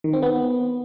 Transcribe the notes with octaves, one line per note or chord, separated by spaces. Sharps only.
D#3
C4
B3